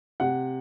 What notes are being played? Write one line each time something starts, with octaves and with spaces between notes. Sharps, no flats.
C3 F#5